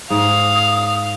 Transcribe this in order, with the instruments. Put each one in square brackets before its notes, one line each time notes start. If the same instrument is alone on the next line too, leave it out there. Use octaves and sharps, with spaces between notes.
[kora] G#2 [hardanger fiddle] F5 [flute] D#6